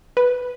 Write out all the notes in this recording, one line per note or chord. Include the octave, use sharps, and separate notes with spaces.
B4